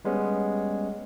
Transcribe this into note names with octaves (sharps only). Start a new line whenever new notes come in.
G3 G#3 B3 C#4